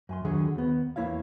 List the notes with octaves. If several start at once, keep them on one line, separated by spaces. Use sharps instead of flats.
F#2 G#5 C6
D#2 D3 D#3 F#3 G#4
D#2 B3
E2 A#3 E4 C#5 F5